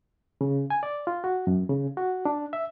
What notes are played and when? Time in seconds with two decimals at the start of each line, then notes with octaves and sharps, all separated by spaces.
0.41 C#3
0.70 G#5
0.83 D5
1.07 F4
1.24 F#4
1.47 F#2
1.69 C#3
1.97 F#4
2.25 D4
2.53 E5